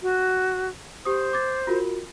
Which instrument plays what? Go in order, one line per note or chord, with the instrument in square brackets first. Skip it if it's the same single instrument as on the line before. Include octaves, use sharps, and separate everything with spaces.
[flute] F#4
[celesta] G4 D#6 [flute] C5
[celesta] D6 G#6 A6
F4 F#4 A#4